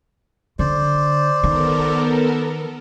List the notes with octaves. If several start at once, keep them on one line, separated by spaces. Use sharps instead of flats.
D3 C5 D5
D#3 B3 A4 A#4